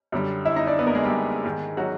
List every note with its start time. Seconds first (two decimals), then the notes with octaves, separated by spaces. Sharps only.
0.12 F#2 D3 G3
0.45 E4 E5
0.56 D#4 D#5
0.67 D4 D5
0.79 B3 B4
0.87 A#3 A#4
0.95 G#3 G#4
1.03 G3 G4
1.45 G#2 D#3 G#3
1.77 F#3 F#4